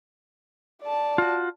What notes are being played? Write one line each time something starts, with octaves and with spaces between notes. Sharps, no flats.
D5 A5
F4 F#4